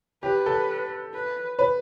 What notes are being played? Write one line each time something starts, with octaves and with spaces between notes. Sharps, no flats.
G4 B4
A4
B4
B4